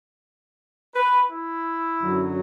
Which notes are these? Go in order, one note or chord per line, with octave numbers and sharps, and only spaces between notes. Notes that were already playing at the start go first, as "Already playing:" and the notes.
B4
E4
F#2 D3 F#3